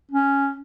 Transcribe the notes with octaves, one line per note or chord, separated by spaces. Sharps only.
C#4